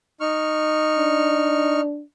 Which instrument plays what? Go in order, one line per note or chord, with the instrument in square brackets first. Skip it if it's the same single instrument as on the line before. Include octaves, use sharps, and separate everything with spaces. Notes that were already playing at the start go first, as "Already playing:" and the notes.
[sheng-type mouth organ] D#4 C#6 F6
[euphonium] D4